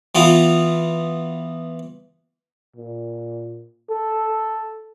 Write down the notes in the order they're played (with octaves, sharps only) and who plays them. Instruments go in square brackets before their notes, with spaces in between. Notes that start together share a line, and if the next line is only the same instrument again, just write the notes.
[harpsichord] E3 B3 F4
[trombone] A#2
A4